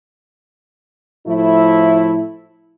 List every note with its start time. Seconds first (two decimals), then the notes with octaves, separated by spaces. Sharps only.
1.27 A2 F3 A3 E4